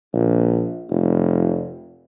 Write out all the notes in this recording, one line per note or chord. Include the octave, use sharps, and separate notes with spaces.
A#1
F1